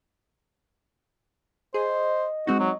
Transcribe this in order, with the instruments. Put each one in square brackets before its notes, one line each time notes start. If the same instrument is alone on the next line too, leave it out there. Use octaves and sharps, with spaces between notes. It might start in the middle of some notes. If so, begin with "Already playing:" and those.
[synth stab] G#4 [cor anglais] C5 [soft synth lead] D#5
[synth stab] G#3 C4 D#4 [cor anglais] F#4
[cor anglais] F#3